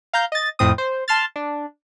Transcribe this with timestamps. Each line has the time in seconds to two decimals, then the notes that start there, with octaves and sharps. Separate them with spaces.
0.13 F5 A#5 G6
0.32 D#5 A6
0.59 F2 A2 C4 D#6
0.78 C5
1.08 A5 C6 F6 A6
1.36 D4